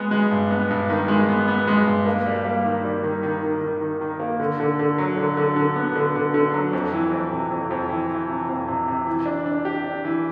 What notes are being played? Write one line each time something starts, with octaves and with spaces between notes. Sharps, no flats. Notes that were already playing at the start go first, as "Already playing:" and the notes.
Already playing: G#3 B3
G#3
G2
B3
G2
D#3
G#3
B3
B3
G#3
G2
A#3
G3
A#3
D#3
G3
D#3
D#3
D#3
D#3
D#3
D#3
A#3
D3
D3
D3
F#3
D3
D3
D3
B3
D3
D3
D3
F#3
F2
E3
F2
C3
F2
F2
E3
E3
C3
F2
C3
C3
E3
D4
D4
G4
D4
E3